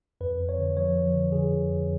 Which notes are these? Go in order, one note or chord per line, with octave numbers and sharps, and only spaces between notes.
F2 B4
F2
C#5
D3
F3 C#5
F3
D3
D3 G#4
F2
F2